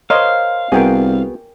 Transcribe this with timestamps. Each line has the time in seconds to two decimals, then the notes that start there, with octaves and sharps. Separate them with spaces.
0.10 A#4 C5 C#5 D#5 F5 C6
0.72 C2 B3 F#4 G#4 A#4 G5 G#5